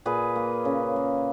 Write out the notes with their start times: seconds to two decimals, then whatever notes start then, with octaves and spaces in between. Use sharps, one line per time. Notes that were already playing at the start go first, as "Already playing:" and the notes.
0.05 A#2 G#4 B4
0.36 A#3
0.65 C#3
0.96 A#3